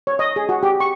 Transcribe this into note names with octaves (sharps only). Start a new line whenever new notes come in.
C#5
D#5
G#4
F#4
G4
C#6